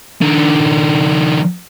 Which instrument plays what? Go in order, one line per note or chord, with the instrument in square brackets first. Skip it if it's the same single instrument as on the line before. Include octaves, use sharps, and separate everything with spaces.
[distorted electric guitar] D#3 D4